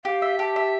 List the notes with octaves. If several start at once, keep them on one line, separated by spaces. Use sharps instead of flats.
G4 F5
E5
G4 A5
E5